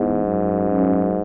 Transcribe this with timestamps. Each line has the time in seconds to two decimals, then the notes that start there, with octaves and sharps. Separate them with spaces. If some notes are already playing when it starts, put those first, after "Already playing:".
Already playing: E2 G#2
0.25 F#2
0.70 F#2